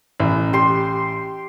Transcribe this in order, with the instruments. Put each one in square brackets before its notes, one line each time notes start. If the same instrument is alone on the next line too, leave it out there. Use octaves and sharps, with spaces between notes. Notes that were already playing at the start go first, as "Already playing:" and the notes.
[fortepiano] A1
[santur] G4 C6